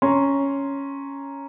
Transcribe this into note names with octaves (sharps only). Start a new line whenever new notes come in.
C#4 A#5 C6